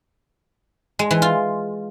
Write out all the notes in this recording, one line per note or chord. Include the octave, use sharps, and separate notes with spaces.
G#3
E3
F4